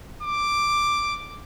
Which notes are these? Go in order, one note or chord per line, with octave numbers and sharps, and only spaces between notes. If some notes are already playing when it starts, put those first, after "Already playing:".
D6